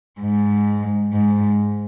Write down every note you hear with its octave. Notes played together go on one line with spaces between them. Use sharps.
G#2
G#2